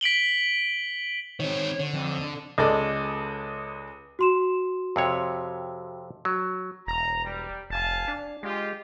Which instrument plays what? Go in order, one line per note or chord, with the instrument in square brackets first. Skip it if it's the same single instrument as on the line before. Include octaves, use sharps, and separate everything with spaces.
[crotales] B6 D7 F#7 G7
[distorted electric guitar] D#3 C4 [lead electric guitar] C#5
[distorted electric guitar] D3
[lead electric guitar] F2
D4 A4
[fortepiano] C#2 G#3 A4 D5 D#5
[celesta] F#4 C6 E7
[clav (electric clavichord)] F2 C3 C#5
F#3
[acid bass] E1 [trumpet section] A#5
[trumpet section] G3
[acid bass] F1 [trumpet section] F5 G#5 A5
[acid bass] D4
[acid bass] G#3 [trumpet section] F4 G4